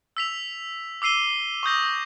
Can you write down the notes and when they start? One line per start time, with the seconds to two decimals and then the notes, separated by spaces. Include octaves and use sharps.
0.17 E6 B6 F7
1.02 D6 E6 C7 D#7 G7
1.63 C#6 D#6 G6 A#6